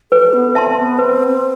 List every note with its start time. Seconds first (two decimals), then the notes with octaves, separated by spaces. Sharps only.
0.12 A4 B4
0.33 B3
0.55 C4 E5 A5 C6
0.77 B3
0.98 C4 B4
1.28 C4